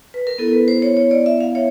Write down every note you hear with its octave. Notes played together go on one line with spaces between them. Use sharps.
B4
A#4
B3 E4 A4
B4
C5
C#5
C#5
D5
E5
F5
C#5